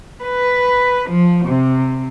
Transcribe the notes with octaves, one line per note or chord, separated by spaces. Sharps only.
B4
F3
C3